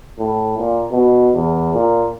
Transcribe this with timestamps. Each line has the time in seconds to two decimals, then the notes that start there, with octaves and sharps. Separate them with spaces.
0.19 A2
0.58 A#2
0.91 B2
1.34 E2
1.74 A#2